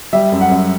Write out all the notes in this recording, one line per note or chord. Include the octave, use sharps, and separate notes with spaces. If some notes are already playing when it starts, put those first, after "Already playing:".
G3 E5
F#2
F#5
F#2